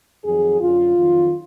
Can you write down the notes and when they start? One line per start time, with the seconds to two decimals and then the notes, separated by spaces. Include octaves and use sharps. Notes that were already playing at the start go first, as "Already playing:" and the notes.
0.24 F2 D#3 F#3 G#4
0.60 F#2 D3 F#3 F4
0.97 F2 D#3 F#3